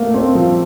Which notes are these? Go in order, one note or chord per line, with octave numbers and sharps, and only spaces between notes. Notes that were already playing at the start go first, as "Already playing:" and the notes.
Already playing: A3 A#3
C4
F3